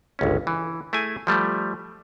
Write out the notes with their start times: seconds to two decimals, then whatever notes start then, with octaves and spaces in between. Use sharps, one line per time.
0.19 G1 C#2 C#4
0.47 E3
0.93 A3 E4 G#4 G#5
1.27 F3 G3 A3